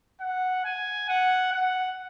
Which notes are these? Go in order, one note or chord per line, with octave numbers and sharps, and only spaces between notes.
F#5
G#5
F#5
F#5